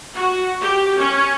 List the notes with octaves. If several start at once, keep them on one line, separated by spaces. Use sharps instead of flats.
F#4
G4
C#4